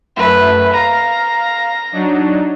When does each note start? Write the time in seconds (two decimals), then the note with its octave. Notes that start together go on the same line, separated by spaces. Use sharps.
0.16 F#2 A3 B4 E5
0.73 F5 A#5
1.92 F#3 D4 D#4